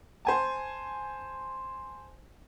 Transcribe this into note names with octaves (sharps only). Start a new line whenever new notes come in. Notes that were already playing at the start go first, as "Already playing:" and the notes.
C5 G#5 A5